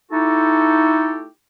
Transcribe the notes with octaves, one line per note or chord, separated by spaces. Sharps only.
A3 D#4 E4 F#4 G4 A4